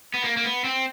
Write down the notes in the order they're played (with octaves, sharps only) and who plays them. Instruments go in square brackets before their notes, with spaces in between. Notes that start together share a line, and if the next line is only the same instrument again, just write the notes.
[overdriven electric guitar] B3
A#3
A#3
B3
C4